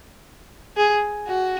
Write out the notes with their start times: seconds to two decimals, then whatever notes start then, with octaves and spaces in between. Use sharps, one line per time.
0.77 G#4
1.27 F#4